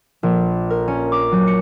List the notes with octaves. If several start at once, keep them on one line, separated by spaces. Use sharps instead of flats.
A#1
A#4
C#4
D6
F#3
C#7